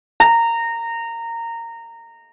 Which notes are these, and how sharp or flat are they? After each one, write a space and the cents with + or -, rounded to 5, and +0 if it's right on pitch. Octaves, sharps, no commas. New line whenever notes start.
A#5 -15